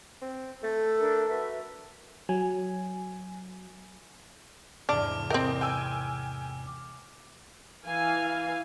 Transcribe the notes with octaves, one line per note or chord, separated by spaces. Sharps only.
C4
A3 A4
D4 A#4 E5
F#4 B4 E5
F#3 G#5
E2 G#2 C3 D4 D6 F6
C4 A#4 C5 D#5 G5
G5 G#5 E6
E3 F5 G#5